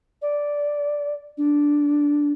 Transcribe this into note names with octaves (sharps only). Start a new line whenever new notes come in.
D5
D4